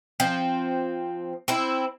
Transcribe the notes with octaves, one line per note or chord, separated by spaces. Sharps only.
F3 C4
C4 E4